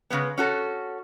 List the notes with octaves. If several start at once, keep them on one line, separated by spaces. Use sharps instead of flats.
C#3 G#3 B3
C#4 F#4 A4